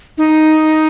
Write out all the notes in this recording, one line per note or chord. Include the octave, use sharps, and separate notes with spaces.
D#4